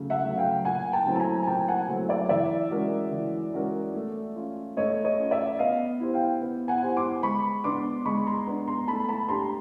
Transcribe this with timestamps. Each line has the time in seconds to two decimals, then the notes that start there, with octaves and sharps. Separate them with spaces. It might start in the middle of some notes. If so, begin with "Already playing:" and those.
Already playing: C#3 F#3 A3
0.10 E5 F#5
0.24 F#3 A3
0.38 F5 G5
0.65 A#2 F#5 G#5
0.92 G5 A5
1.06 F#3 A3 C4 E4
1.16 A5
1.20 G#5 A#5
1.43 G#5
1.47 A#2 G5 A5
1.68 F#5 G#5
1.89 F#3 A3 C4 E4
2.09 D5 E5
2.29 E3 D5 E5
2.71 G#3 C#4 F#4 A#4
3.12 E3
3.53 G#3 C#4 F#4 A#4
3.95 A3
4.36 C#4 F4
4.77 A3 C#5 D#5
5.05 C#5 D#5
5.18 C#4 F4
5.31 D5 E5
5.59 B3 D#5 F5
6.00 E4 G4 C5
6.14 F5 G5
6.41 B3
6.68 F#5 G#5
6.82 E4 G4 C5
6.97 C6 D6
7.23 G#3 B5 C#6
7.64 B3 D4 C6 D6
8.05 G#3 B5 C#6
8.27 A#5 C6
8.47 B3 D4
8.67 A#5 C6
8.88 A3 A5 B5
9.09 A5 B5
9.29 D4 G4 A#5 C6